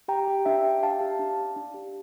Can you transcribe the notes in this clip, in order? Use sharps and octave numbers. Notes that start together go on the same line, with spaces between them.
G4 G5 A#5
G4
D4 E5 G5
G4
G4 F5 A5
G4
D4
D4
D4
G4